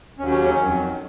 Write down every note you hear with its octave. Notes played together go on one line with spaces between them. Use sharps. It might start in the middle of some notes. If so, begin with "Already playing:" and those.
D#2 C#3 F#3 C#4
C#4
C#4
F2 D#3 F#3